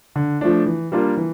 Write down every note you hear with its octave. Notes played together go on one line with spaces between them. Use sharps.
D3
F3 A3 D4
E3
G3 A#3 D4 F4
E3